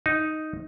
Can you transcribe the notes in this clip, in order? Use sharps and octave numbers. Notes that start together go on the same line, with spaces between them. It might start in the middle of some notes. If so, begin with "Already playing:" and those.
D#4